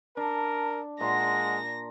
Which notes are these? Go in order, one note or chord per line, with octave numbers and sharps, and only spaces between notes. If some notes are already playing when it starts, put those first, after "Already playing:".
D4 A#4 A5
A#2 G#3 F#5 A#5 C6 A#6